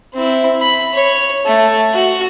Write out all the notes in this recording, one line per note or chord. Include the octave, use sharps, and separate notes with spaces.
C4 E4
B5
C#5
A3
F#4